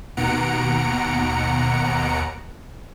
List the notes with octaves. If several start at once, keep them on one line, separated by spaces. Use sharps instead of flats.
D#2 B2 F#5 A#5 C#7 D7